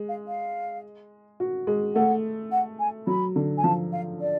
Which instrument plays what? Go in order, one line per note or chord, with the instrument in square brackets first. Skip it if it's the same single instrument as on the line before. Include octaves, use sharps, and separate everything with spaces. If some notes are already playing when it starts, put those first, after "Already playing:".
Already playing: [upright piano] G#3
[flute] F5
F5
[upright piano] F#4
G#3
[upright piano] A3 [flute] F#5
[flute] F#5
G#5
[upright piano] F#3 [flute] B5
[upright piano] D3
[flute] G#5
[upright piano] F3 [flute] A5
[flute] F5
D5